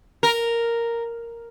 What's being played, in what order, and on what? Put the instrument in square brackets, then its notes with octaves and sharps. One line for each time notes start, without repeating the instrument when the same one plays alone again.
[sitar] A#4